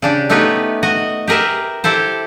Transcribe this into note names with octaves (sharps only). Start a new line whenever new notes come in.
C#3 D4 G4
A3 B3 D#4 G4 B4 C#5
F#4 D#5
G4 G#4 A#4 B4 E5
E4 G4 A4 C5